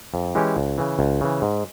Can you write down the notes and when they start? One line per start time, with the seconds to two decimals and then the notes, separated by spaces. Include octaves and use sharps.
0.14 F2
0.35 E3 G#3 C#4 G4
0.57 C#2
0.78 C#3 E3
0.99 C#2
1.21 C#3 E3
1.42 G#2